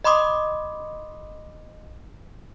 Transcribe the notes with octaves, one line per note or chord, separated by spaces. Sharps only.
D#5 B5 C6 D6 D#6